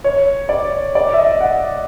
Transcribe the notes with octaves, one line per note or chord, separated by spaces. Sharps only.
C#5
D5
D5
E5
D#5
F#5